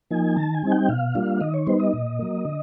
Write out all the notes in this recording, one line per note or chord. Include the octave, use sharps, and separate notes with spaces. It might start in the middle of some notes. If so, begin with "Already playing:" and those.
F3 A#3 D#4 G#5
D#3 A5
G#5
G3 C4 D#4
G5
B2 F5
G3 A#3 D4 F4
D#3 D#5
C#5
G3 B3 D#4 C5
D#5
A#2
F#3 A#3
D3